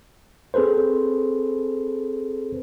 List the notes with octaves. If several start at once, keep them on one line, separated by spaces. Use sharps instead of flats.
C4 G#4 A4 B4 C5